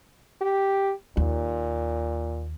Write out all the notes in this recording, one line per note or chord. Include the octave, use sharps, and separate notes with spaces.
G4
D#2 A#2